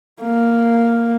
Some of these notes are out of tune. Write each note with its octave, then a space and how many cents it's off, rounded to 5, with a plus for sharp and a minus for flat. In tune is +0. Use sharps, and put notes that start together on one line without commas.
A#3 -5